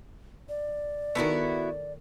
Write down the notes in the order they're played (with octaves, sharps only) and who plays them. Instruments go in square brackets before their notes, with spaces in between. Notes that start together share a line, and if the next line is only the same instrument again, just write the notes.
[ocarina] D5
[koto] D#3 A3 [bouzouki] B3 E4 F#4